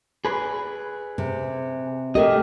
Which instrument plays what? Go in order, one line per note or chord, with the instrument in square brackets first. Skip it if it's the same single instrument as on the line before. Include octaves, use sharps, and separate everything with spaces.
[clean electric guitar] G#4 B4
[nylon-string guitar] C3
[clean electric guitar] A3 D#5 [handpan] G4 A#4